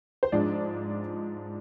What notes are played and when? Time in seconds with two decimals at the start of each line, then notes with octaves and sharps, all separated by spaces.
0.23 C5
0.32 G#2 F3 G#3 D4 D5